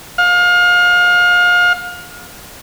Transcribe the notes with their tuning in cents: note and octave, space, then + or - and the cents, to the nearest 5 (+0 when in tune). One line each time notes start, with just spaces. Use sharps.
F5 +30